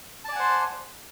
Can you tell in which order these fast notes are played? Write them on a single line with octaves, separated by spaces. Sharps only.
A5 D5 G#5 F#5 C5